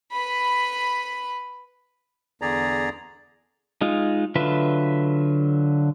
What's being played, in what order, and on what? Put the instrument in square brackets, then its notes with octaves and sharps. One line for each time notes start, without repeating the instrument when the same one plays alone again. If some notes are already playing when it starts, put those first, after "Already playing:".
[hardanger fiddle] B4 B5
[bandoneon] E2 D3 G#4 D5 A#5
[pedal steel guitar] G#3 D#4 F4
D3 F#3 F4 B4 E5